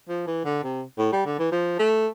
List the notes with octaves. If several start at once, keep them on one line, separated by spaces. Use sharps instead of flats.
F3
E3
D3
C3
A2
G3
D3
E3
F3
A3